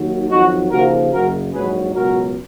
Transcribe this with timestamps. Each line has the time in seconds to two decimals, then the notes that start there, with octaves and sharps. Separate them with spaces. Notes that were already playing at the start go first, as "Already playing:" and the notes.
Already playing: D#2 D#3 F#3
0.30 F2 D#3 F#3 D#4 F#4
0.72 D#2 C#3 F3 F#4 A#4
1.13 F#1 F#2 C#3 F#4 A#4
1.54 A#1 G#2 D#3 F#3 G#4 B4
1.95 C#2 B2 F#3 F#4 A#4